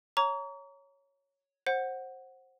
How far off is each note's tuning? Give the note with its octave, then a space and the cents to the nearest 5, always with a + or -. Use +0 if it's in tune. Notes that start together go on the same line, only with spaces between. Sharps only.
C#5 +0 A#5 +0 C#6 +45
C5 +20 F#5 +0